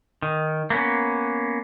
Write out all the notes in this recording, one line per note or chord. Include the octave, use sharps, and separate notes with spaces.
D#3
A#3 B3 C#4